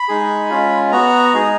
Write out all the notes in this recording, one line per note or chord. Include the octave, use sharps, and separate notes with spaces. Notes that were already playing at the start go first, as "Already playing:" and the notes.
Already playing: B5
G#3 D#4 G#4
G#3 C#4 F4
B3 F#4 A#5
G#3 D#4 G#4